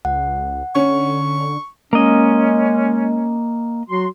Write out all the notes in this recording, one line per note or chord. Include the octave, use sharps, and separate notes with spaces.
C#2 F#5
D3 C#4 C#6
G#3 A#3 C#4 D#5
F#3 F#4 C6